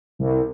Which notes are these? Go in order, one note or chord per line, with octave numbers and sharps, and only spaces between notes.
C2